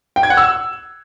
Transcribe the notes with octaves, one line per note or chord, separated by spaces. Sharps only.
G5
G#6
F#5
E6